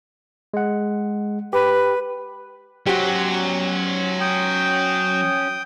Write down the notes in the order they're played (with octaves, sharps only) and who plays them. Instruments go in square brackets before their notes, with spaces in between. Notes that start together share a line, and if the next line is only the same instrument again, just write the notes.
[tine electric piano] G#3 F#5
[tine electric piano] G4 [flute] B4
[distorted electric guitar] F#3 [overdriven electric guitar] C#4 C5 [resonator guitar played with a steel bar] F#4 G4
[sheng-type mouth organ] G5 D#6